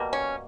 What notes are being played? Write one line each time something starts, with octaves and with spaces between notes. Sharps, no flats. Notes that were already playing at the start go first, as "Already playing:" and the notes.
Already playing: B2 G3 A#3
C#4